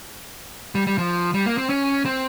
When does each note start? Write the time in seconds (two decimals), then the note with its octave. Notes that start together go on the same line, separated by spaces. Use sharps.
0.75 G3
0.87 G3
0.98 F3
1.34 G3
1.46 A#3
1.58 C4
1.69 C#4
2.05 C4